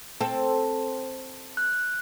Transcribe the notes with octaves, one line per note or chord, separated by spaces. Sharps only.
C4 A4
F#6